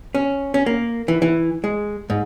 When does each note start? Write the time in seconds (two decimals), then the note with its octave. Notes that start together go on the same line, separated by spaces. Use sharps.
0.15 C#4
0.54 C#4
0.66 A#3
1.08 E3
1.22 E3
1.64 G#3
2.10 G#2